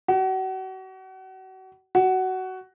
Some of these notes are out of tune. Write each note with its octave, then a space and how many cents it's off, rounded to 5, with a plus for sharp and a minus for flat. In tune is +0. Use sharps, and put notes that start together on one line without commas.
F#4 +35
F#4 +15